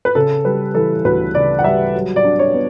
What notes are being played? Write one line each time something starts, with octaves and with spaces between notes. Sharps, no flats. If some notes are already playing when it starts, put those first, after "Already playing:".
B4
C#3 A4
G3 B4
E3 A4
D2 B4
C#3 D5
F#5
G3 E5
F#3
D5
D4
C#5
B3